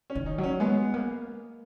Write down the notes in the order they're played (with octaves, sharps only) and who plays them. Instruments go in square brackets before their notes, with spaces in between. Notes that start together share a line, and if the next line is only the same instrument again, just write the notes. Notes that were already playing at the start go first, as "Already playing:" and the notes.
[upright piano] C#4
[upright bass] D#3
[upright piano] D#4
[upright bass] F#3
[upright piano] C#4
[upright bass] G#3 [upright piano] B3
[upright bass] A#3